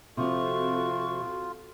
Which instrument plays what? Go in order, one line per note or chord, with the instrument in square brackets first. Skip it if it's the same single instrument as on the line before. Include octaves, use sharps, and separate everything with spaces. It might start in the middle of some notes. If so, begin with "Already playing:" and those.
[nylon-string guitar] C3 F3 [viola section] C4 F#4 A4 [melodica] F4 [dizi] C#6